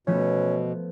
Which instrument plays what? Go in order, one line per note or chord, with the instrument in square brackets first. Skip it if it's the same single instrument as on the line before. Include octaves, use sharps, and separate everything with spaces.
[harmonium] B2 [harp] F3 A3 B3 [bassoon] C#4